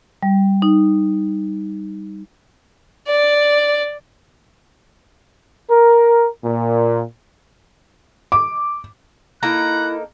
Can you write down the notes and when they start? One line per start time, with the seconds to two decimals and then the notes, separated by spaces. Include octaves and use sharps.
0.23 G3
0.62 D#4
3.07 D5
5.70 A#4
6.44 A#2
8.32 D6
9.43 A#3 D#4 E4 A4 A#5 F#6